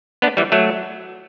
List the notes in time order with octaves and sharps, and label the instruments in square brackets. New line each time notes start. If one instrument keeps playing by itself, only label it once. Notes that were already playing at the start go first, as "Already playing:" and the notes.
[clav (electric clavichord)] B3 D4
E3 G3
F#3 A3